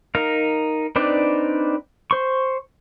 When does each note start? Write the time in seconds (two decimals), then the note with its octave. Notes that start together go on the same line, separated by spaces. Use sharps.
0.15 D#4 A#4 F5
0.96 C4 D4 D#4 B4 D5
2.11 C5 C#6